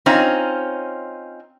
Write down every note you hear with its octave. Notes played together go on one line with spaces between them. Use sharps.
C4 C#4 D#4 F4